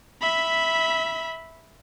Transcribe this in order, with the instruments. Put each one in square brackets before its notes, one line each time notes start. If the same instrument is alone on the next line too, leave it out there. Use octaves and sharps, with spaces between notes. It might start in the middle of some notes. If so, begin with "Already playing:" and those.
[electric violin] E5 B5